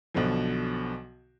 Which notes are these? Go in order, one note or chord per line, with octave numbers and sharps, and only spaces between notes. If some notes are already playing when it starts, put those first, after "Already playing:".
B1 B2 D3 F3